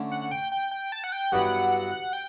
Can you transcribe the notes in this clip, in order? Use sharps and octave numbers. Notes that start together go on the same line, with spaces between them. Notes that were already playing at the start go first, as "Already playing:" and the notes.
Already playing: D3 A3 C#4
F#5
G5
G5
G5
A5
F#5
G5
G2 F#3 B3 E4 G4 F#5
G5